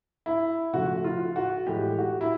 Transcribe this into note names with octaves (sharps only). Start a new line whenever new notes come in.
E4
C#3 F3 A3 F#4
F4
F#4
A2 E3 G#3 G4
F#4
E4